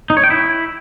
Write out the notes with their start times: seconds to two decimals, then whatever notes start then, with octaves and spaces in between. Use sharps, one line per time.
0.10 D#4
0.17 C#5
0.24 G5
0.30 E4